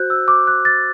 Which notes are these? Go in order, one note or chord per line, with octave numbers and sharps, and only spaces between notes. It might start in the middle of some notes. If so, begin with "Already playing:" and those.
Already playing: F#4 C5 F#6 G6
E6
D6
F#6
A6